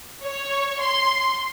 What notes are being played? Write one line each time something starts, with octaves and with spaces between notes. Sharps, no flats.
C#5
C6